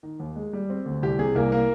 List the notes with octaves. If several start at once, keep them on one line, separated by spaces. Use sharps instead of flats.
D#3
D#2
G#3
G3
C4
D2
C2 G4
C3 G#4
C2 A#3 A#4
A#3 A#4